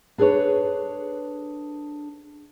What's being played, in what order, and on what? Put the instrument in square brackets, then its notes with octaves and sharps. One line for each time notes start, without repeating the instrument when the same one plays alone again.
[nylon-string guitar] D4 G#4 A4 B4 C#5